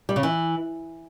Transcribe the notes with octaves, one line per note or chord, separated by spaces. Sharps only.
G3
C#3
E3